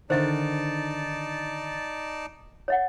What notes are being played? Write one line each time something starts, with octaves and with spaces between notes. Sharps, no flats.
D3 D#3 D#4 C5 D5 E5 A5
C#5 E5 F#5